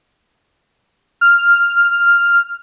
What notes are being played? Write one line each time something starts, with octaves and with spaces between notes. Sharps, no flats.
F6